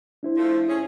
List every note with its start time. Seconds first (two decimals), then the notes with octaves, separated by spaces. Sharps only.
0.23 D4 E4 C5
0.37 F3 A3
0.68 C#4 G#4